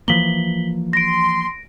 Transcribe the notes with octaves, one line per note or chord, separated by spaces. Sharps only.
E3 F3 A#3 B6 F#7 G7
C6 A#6 D7